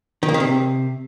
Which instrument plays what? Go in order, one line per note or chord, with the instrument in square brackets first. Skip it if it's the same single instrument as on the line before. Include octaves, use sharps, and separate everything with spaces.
[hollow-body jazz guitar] D#3
A#3
D#3
C3